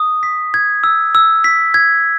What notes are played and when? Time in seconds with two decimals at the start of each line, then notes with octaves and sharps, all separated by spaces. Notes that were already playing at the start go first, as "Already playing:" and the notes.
Already playing: D#6
0.23 B6
0.54 G#6
0.84 E6
1.15 E6
1.44 B6
1.74 G#6